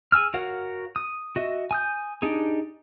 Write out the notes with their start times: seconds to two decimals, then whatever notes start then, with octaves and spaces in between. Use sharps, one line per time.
0.12 G#4 G#5 E6 F6
0.34 F#4 A#4 C#5 F5 F#5
0.96 D#6
1.36 F#4 D#5 E5
1.71 G#5 D#6 G6
2.22 D4 D#4 G4 G#4